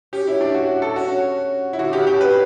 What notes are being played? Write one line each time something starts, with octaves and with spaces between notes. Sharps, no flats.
C#4 G4
E4
D4
F#4
A4
C#4 F#4
E4
D3 F#4
C#3 G4
B2 G4
C#3 B4